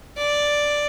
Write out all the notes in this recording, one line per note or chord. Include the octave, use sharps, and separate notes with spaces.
D5